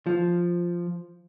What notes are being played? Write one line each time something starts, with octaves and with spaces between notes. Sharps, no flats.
F3